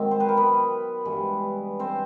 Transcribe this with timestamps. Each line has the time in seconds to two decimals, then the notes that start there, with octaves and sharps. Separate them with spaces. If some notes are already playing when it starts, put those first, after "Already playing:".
Already playing: G#2 D#3 F#3 C4
0.11 C5
0.20 B4
0.29 A#4
0.37 B3 B4
1.05 G2 E3 G#3
1.79 C4 C5